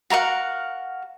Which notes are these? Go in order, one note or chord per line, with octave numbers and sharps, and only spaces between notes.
F#4 A#4 F5 F#5